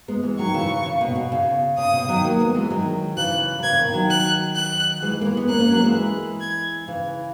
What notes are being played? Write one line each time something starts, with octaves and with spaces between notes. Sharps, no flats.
G#3 B3
E3 G#3
D#3 F#3 C#6
C#3 E3
C#3
C#3
B2
B2
C#3
C#3 D#6
B2
D#3 F#3
F#3 A#3
G#3 B3
E3 G#3
D#3 F#3
C#3 E3 F#6
F#3
C#3 E3 G#6
B2 D#3
D#3 F#3
F#6
F#6
E3 G#3
A#3
E3 G#3
G#3 B3
A#3 C#4 F#6
A#3 C#4
F#3 A#3
E3 G#3
G#6
C#3 E3